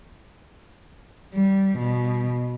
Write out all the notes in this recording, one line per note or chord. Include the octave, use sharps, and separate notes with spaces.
G3
B2